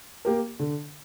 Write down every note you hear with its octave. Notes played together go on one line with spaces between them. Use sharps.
A#3 G4 A#4
D3